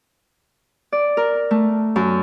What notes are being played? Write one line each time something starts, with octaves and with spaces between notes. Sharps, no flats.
D5
A#4
A3
F#2